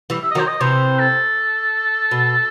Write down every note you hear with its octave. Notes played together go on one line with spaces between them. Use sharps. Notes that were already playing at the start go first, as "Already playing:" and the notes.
E3 G3
E5
D#5
D#3 F#3
C5
D#5
C3 E3 C5
A4
B2